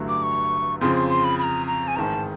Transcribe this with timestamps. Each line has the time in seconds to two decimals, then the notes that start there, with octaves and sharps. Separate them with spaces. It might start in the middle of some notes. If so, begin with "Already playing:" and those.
Already playing: A1 G2 D3 F#3 A3
0.09 D6
0.23 C#6
0.81 F2 C#3 F3 C6
0.95 C6
1.09 C6
1.24 B5
1.39 B5
1.43 A#5
1.67 A#5
1.88 G#5
1.96 A1 G#2 D#3 A5 A#5